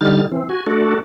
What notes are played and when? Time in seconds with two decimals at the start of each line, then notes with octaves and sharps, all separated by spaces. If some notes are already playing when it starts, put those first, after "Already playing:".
0.01 D3 G3 D#4 F6 A6
0.32 E3 C4
0.49 F#4 G#5
0.67 A3 D4 F#4 A4